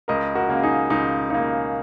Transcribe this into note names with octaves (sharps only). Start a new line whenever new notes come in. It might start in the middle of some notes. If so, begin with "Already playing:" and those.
C#2 A#4 D#5
F#4 A#4
C#3 A#3
D#4 G#4
C#2 D#4
C#3 A#3 D#4